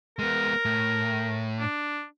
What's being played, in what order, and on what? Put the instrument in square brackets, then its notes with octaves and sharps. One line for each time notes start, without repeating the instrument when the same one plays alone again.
[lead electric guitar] G#3 B3 [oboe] A#4
[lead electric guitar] A2
[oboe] D4